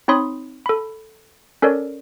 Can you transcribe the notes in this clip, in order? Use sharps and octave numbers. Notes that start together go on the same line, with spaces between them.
C4 D#4 C#5 B5 C6 D#6
A4 B5
C#4 A4 A#4 C#5 D5